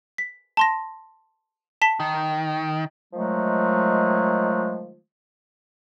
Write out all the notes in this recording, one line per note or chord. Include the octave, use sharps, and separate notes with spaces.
B6
A5 C6 A#6
A5 B6 G7
D#3
D#3 F3 F#3 G#3 A3